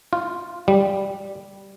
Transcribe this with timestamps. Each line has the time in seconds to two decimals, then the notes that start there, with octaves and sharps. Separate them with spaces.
0.13 F4
0.68 G3